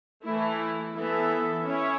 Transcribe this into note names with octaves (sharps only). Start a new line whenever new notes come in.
E3 A3 E4
E3 B3 A4 E5
C#4 E4 C#5 E5